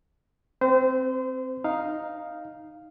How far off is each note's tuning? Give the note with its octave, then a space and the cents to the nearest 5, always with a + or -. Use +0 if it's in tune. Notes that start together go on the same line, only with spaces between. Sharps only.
C4 +0 C5 -30
D#4 +0 F5 +0